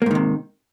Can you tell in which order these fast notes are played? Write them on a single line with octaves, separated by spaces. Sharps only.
A#3 G#2 D#3 C3